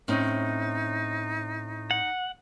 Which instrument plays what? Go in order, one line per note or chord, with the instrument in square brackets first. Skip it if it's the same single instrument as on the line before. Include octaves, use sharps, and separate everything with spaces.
[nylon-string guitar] A2 C4 C#4 [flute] D#4
[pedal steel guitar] F#5